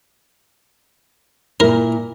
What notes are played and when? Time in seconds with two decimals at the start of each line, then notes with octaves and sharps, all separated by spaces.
1.60 A#2 E4 A#4